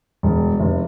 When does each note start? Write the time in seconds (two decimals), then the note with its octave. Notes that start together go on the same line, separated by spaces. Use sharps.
0.23 E1
0.60 F1